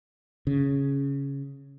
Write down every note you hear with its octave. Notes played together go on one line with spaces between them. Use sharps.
C#3